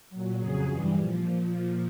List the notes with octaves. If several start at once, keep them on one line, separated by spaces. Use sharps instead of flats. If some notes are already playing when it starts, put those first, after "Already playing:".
A#2 F#3
F2 C#3 F#3 G#4
G2 E3 G3
A#2 F3